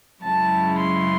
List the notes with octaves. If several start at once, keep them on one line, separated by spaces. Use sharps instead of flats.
F#2 C#3 G#3 C#4 E4 A5
C6